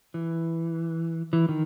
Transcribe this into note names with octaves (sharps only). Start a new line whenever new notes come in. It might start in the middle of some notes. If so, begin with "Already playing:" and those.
E3
E3
D#3